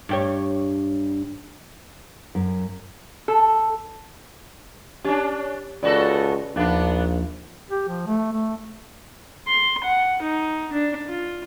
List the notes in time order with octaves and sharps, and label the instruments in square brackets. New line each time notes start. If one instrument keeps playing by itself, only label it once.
[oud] G2 G4 C#5
[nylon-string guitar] F#2
[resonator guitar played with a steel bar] A4
[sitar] C#4 D4 [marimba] G4
[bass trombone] C#2 [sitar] B3 F#4 A4 [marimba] D5
[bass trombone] A#1 [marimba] D#2 F3 [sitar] B3 D4
[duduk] G4
F3
A3
A3
[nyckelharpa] C6
F#5
D#4
D4
F4